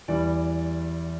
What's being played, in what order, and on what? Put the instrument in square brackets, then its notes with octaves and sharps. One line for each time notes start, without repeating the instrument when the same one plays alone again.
[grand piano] E2 E3 G3 D5